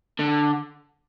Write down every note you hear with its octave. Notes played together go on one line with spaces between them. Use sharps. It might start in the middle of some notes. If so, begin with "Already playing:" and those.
D3